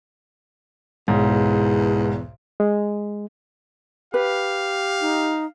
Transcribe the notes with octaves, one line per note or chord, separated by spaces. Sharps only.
B1 E2 G#2
G#3
G4 B4 F5
D#4